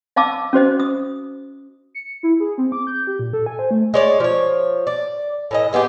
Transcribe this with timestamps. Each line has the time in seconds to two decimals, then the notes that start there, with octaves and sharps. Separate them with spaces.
0.16 D#5 F5 A5 D6 E6
0.53 C#4 F#4 C5 D#5
0.79 D#6
1.95 C#7
2.23 E4
2.40 G#4
2.58 C4
2.72 D6
2.87 G6
3.07 G4
3.19 A#2
3.33 A4
3.46 G#5
3.59 C5
3.71 A3
3.94 G#3 C#5 D5
4.20 F3 C#5
4.87 D5
5.51 A2 E3 D#5
5.73 G#3 B3 E4 G4